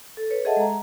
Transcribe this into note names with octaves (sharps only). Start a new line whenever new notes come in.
A4
B4 C#5
G#4 A4 D#5 E5 F#5 A5
G#3 A#5